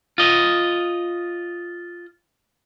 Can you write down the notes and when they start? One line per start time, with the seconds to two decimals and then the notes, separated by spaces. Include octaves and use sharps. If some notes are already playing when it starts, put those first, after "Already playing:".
0.18 F4 D#5